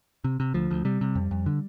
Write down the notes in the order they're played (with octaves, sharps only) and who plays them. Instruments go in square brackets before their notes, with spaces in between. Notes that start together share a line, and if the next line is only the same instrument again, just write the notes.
[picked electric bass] C3
C3
D2 F3
D2
C3 G3
C3
F2
F2
D3